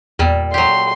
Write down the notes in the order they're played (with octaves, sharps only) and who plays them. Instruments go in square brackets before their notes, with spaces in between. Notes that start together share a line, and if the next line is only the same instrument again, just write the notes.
[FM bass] E2 [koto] A#2 G3
[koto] F#3 G4 [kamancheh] C6